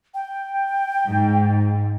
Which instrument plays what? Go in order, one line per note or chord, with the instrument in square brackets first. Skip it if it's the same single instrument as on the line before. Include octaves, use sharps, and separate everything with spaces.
[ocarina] G5
[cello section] G#2